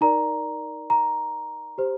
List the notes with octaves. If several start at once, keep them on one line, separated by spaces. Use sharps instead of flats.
D#4 A#4 D5 A#5
A#5
G4 C5